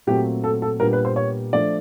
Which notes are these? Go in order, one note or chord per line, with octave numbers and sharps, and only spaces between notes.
A#2 F#3 A3 C4 G4
A4
A4
A#2 G3 B3 D4 A#4
B4
C5
C#5
F3 A3 D4 D5